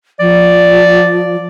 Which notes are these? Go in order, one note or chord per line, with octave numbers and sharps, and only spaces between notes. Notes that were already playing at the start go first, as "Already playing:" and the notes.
F3 D5